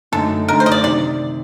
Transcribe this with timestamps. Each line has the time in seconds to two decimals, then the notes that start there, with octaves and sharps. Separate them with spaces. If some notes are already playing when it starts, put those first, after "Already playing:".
0.12 F#2 D3 A3 D#4 A4
0.47 F#2 D3 A3 D#4 A#4
0.60 C5
0.66 D#5
0.72 D5
0.83 C3 D#3 D5